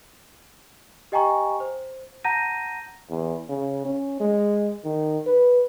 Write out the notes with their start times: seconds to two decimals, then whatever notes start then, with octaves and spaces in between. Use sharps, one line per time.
1.12 G4 D#5 G5 G#5 A#5 C#6
1.60 C5
2.24 F#5 A5 A#5 G6 A#6 D#7
3.10 E2
3.49 C#3
3.85 C#4
4.20 G#3
4.84 D#3
5.26 B4